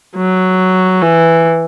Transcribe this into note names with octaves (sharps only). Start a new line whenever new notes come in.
F#3
E3